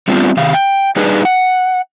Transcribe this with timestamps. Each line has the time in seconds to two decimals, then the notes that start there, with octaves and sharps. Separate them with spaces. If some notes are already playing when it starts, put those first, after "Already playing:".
0.08 G3 A3 B3 C4 D4 F4
0.37 C3 D#3 F5
0.54 G5
0.96 G3 D4 D#4 G#4 B4
1.25 F#5